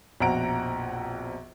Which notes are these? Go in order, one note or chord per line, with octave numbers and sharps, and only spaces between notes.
A#1 F2 B2 F#5 A#5 D7